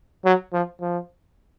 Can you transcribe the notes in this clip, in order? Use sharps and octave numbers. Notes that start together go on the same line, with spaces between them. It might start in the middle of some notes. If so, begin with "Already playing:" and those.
F#3
F3
F3